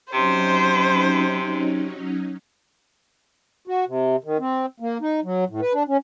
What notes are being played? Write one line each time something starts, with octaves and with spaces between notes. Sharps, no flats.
C3 F#3 C#4 D#4 C5
F#4
C3
D#3
C4
A#3
D#4
F#3
A2
B4
D4
C#4